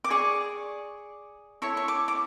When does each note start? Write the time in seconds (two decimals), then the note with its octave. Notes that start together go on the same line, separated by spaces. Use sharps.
0.04 D6
0.10 G#4 D5 C#6
1.62 E4 A4 C#5 C#6
1.77 C#6
1.88 D6
2.08 D6